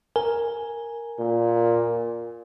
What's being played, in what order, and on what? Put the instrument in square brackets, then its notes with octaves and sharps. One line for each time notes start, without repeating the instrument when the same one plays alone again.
[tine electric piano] A#4 G#5
[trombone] A#2